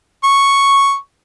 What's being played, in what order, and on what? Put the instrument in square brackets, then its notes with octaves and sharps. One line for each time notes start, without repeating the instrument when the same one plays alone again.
[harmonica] C#6